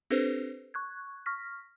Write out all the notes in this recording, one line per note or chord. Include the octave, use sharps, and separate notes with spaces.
C4 D4 G4 A4 B4 C5
C#6 F#6 G#6
C#6 F6 A#6 B6